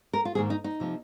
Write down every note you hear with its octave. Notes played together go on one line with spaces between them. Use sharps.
A#4
F4
G#2 D#3 A#3 G#4
D#4
D#4
C3 F3 A#3